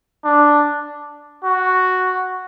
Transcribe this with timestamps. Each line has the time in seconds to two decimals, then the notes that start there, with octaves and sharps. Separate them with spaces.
0.24 D4
1.43 F#4